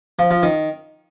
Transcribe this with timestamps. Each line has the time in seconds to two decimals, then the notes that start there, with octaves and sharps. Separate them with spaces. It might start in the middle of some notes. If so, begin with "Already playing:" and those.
0.19 F3
0.31 F3
0.43 D#3